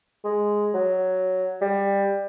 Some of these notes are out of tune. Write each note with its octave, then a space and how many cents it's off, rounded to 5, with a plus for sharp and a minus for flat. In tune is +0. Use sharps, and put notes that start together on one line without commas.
G#3 +0
F#3 +5
G3 +20